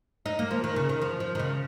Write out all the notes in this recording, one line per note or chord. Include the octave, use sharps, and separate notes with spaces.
D#4
A#3
F3
D#3
C#3
D#3
F3
F3
D#3
C#3